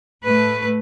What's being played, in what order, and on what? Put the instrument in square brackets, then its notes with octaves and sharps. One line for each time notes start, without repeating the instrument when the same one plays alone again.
[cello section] A2 A3 B4